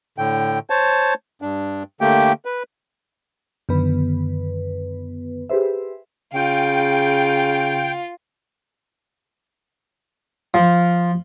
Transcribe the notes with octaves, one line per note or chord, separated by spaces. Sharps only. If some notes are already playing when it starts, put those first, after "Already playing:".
A2 D3 G5
C5 C#5 A5
G2 D4
D3 A3 A#3 G4 G5
B4
F#2 D3 D#3 B3 B4
G4 G#4 B4 C5 E5
C#3 F4 G5
F3